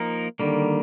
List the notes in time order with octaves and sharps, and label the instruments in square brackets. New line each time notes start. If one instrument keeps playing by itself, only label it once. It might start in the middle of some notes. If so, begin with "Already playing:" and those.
Already playing: [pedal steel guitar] F3 A#3 D#4 A#4
[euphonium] D3 [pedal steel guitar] D#3 G3 A#3